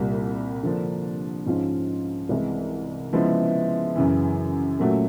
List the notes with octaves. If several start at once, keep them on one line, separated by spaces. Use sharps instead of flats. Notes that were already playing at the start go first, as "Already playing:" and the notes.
Already playing: C2 A#2 G3
D3 F3 A#3 D4
G#2 F3 G#3 C#4 F4
C2 C3 E3 G#3
C#3 F3 G#3 B3 E4
F#2 C#3 E3
A#2 F#3 A3 C#4 F#4